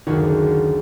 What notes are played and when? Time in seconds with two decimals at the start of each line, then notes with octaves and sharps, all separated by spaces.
0.07 F#1 D2 D#3 F#4